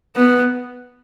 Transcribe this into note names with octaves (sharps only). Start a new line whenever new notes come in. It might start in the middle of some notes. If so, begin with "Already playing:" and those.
B3